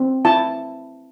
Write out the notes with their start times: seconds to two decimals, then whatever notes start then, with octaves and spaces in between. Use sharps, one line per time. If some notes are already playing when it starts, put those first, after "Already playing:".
Already playing: C4
0.25 E4 A5